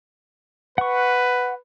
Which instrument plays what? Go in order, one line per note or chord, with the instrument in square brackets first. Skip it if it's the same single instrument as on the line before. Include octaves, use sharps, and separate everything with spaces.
[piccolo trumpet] B4 [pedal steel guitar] F#5 C#6